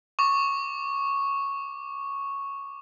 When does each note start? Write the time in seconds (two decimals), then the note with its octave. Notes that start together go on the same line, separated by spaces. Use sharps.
0.19 C#6 D6